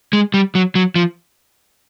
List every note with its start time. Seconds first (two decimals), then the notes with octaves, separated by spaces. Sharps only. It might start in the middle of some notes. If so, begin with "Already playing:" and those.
0.13 G#3
0.34 G3
0.55 F#3
0.75 F#3
0.96 F3